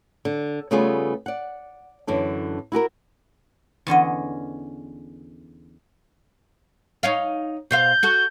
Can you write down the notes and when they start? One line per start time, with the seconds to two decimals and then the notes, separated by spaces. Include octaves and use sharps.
0.25 D3
0.71 C#3 G3 A3 B3 F4 G#4
1.26 D5 F#5
2.07 F#2 D3 E3 D4
2.72 E4 F#4 G4 A#4
3.87 E2 D3 C#4 D#5
7.03 D#4 C#5 F5
7.71 B2 C5 F5 G6
8.03 F#4 A4